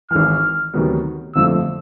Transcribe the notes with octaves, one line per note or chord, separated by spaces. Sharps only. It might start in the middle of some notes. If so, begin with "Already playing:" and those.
G#1 G#2 E3 F6
D2 C3 D#3 F#3 B3
G1 F2 D3 F3 A3 E6